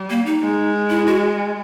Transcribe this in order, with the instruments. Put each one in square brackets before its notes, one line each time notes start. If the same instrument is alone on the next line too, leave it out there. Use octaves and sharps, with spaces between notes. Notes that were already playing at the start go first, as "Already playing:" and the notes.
Already playing: [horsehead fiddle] G3
[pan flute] A#3
D#4
[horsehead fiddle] G#3
[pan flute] E4
F#4